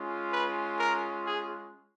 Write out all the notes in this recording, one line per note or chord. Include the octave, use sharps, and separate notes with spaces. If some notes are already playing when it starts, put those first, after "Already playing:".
Already playing: G#3 C#4 F4
B4
A#4
G#4